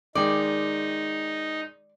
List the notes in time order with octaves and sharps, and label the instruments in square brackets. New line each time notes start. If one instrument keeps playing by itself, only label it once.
[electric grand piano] D#3 G#3 G5 [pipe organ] D#4 [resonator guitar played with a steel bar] D5